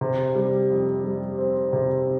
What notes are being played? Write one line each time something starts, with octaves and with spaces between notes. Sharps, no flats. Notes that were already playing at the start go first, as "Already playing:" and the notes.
C3
G3
F2
G3
C4
C3